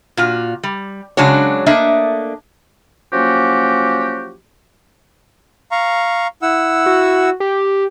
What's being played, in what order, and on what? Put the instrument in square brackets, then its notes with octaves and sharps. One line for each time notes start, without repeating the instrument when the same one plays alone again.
[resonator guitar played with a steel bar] A#2 F4 F#4
G3
C#3 F#3 G#3 D4 F#4 C#5
A3 A#3 D4 D#5 E5
[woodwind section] F3 F#3 A#3 C#4 F#4 G4
[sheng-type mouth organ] F5 A#5 C#6
E4 F#5 E6
[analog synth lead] F#4
G4